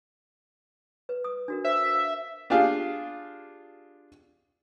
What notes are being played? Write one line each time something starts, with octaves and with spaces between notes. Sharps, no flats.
B4
D#6
D4 F#4 A#4
C5 E5
F5
D4 F4 G4 G#4 F5